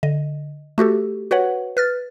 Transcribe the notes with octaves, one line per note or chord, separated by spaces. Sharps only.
D3 D#5
A3 F#4 G4 A4
F#4 B4 C#5 F#5
B4 F6 A6